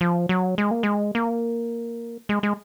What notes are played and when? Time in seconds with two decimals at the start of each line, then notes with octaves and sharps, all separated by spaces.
0.01 F3
0.29 F#3
0.58 G#3
0.71 A#3
0.83 G#3
1.15 A#3
2.29 G#3
2.43 G#3